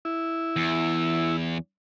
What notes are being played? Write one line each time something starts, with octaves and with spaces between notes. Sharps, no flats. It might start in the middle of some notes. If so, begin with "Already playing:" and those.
E4
E2